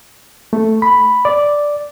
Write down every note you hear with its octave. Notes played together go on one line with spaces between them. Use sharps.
A3
B5
D5